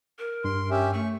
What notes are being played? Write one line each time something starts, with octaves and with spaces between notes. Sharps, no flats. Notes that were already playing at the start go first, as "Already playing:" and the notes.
A#4
G2 C6
C#4 G4 E5
A3 C#6